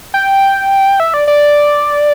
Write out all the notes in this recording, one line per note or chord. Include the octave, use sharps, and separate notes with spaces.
G5
E5
D5
D5